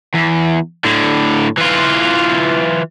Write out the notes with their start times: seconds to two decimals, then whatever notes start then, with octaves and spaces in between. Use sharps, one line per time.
0.15 E2
0.85 A2 D3
1.58 E3 F4